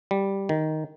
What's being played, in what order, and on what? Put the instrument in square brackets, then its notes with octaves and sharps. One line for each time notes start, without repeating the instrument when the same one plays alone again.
[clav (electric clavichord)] G3
D#3